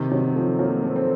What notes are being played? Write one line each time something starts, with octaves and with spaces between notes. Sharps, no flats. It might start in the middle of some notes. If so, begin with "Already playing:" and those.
Already playing: C3 D#3
D#3 F#3
F3 A3
F#3 A#3
A3 C4
C4